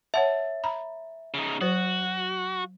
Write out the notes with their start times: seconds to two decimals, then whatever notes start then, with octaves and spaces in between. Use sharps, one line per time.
0.14 C#5 E5 F#5 A5
0.64 A#5 B5
1.34 C#3 D#4
1.61 F#3 F#4 C5